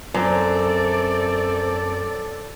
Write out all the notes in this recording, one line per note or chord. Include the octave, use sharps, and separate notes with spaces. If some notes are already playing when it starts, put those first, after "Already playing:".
F#2 C4 A4 D5